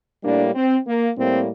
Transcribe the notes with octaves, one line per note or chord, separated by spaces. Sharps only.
A2 G3 A#3 D4
C4
A#3
A2 G3 A#3 C4